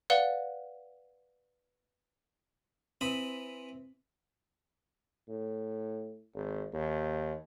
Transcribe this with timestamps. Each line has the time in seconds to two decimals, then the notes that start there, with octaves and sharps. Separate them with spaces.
0.10 B4 D5 F5 F#5 G7
3.01 E3 C4 B5 D#6
5.28 A2
6.35 G#1
6.73 D#2